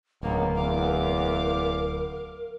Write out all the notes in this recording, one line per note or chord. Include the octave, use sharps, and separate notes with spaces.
D1 C#2 A#3 B3 A#4
E2 F5 D6